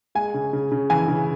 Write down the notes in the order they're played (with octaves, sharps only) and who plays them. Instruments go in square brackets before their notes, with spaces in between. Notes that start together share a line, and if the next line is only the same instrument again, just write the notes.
[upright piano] G#3 [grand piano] G#5
[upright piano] C#3
C#3
C#3
[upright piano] E3 [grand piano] G#5
[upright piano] C#3